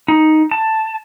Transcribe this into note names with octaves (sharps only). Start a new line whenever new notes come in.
D#4
A5